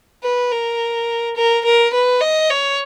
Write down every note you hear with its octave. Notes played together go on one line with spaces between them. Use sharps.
B4
A#4
A#4
A#4
B4
D#5
C#5